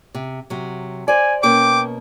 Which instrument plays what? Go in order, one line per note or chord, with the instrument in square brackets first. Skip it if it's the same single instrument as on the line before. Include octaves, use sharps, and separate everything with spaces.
[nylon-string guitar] C3
C3 F#3
[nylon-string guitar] C5 D5 [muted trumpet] G#5
[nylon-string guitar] B2 A#3 C#4 [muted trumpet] G5 [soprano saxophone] D6